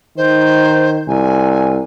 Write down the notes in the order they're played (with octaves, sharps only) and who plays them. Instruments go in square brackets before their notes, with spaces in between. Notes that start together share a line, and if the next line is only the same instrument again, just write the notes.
[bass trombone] D#3 [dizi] C5
[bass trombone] C2 [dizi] G#5